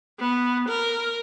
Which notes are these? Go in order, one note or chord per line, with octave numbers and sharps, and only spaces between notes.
B3
A#4